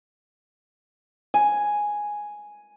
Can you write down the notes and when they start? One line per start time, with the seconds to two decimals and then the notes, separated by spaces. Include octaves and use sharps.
1.34 G#5